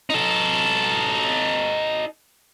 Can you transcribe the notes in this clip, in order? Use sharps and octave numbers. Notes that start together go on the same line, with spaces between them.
D#4 A4